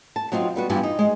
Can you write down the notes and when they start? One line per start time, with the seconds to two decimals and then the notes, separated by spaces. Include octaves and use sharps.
0.16 A5
0.32 F#3 C4 D#4 F4
0.56 G3 B3 F#4
0.70 G2 E3 B3 F4 G4 G#5
0.83 D#4
0.99 G#3